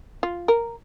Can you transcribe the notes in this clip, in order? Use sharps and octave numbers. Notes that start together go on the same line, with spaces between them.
F4
A#4